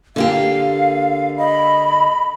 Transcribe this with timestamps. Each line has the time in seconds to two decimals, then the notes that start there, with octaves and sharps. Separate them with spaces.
0.16 D3 A#3 G4 F5
1.38 D#5 B5